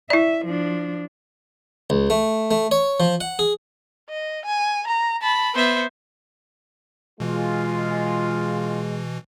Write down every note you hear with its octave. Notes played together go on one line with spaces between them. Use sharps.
E4 D5 E5
F3 D4
C#2
A3
A3
C#5
F3
F#5
G#4
D#5
G#5
A#5
A5 B5
B3 C5 E5
B2 E3 G#3 F4